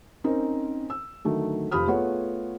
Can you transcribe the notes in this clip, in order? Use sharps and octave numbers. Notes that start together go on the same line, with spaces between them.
C4 C#4 D#4 A#4 C5
E6
D3 D#3 F#3 A3
F1 F3 G4 B5 D#6 F6
A3 B3 F4 G#4 C#5 F#5